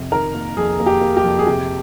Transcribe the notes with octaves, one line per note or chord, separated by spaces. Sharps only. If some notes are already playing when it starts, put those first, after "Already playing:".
Already playing: F2 C3
D#3 A#4
A#3
F2 G#4
A#3
G4
A#3
G4
F2
G#4
C3 G4